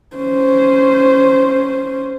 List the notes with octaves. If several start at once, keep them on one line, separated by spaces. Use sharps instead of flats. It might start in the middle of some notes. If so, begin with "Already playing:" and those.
C#4 C5